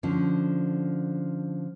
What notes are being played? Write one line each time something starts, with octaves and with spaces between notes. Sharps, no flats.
D3 F3 C#4